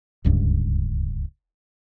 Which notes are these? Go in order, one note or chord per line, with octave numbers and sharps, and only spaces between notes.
D1 C#2 G2